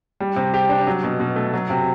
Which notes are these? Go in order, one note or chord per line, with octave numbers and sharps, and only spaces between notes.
G3
C3
G4
D4
F#3
B2
B2
A3
F#3
C3